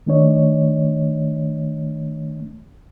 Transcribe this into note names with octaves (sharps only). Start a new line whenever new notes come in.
D#3 A3 D4 C#5 D#5